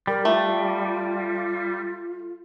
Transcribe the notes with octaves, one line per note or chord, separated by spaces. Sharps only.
G3 A#4
A3 F4